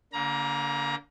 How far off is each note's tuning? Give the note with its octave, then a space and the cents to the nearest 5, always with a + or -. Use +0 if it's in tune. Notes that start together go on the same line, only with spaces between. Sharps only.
D3 -35 A#3 +0 A#5 +30